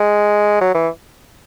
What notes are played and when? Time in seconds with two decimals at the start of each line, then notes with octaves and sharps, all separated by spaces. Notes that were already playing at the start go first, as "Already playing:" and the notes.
Already playing: G#3
0.61 F#3
0.74 E3